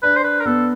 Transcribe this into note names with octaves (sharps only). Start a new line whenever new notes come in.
D4 B4
C5
B4
A#4
B3 A4